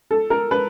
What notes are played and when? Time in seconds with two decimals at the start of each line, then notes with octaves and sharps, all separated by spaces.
0.11 A4
0.30 A#4
0.51 B4